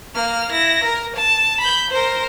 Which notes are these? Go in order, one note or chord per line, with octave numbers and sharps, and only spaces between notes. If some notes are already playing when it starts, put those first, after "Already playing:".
A#3 F6
E4 A#6
A#4
A5
B5 G6
A#4 C5